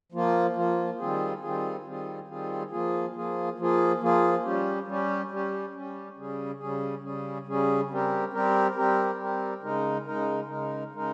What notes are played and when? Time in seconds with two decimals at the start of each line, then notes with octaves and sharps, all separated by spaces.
0.12 F3 A#3 F4
0.55 F3 A#3 F4
0.99 D#3 G3 C4 F4 G#4
1.42 D#3 G3 C4 F4 G#4
1.85 D#3 G3 C4 F4 G#4
2.28 D#3 G3 C4 F4 G#4
2.71 F3 A#3 F4 G#4
3.14 F3 A#3 F4 G#4
3.58 F3 A#3 F4 G#4
4.01 F3 A#3 F4 G#4
4.44 G3 C#4 G4
4.87 G3 C#4 G4
5.31 G3 C#4 G4
5.74 G3 C#4 G4
6.17 C#3 G3 C#4 G#4
6.60 C#3 G3 C#4 G#4
7.04 C#3 G3 C#4 G#4
7.47 C#3 G3 C#4 G#4
7.90 G3 C4 G4 A#4
8.33 G3 C4 G4 A#4
8.76 G3 C4 G4 A#4
9.19 G3 C4 G4 A#4
9.63 C#3 G#3 D#4 A#4
10.06 C#3 G#3 D#4 A#4
10.49 C#3 G#3 D#4 A#4
10.92 C#3 G#3 D#4 A#4